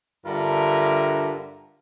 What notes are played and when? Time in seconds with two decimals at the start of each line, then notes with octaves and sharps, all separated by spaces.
0.25 G2 D3 F4 A#4 E5